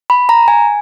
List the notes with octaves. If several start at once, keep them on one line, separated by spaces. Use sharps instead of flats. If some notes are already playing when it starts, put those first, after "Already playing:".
B5
A#5
G#5